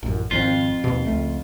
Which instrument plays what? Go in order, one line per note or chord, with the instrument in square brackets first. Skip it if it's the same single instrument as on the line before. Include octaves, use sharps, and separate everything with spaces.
[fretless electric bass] A1 F#2
[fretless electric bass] G#1 C#3 C4 [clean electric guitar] F2 F4
[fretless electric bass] D#2 B2
C#2 A3